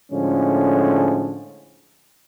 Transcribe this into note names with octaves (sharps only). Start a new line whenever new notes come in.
A2 D3 F3 G#3 C#4